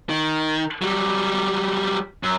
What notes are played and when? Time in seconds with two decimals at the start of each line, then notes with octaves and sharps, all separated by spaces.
0.09 D#3
0.82 F#3 G3
2.23 F#2